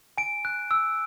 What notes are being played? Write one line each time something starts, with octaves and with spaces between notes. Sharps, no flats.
G#5 D7
F#6
E6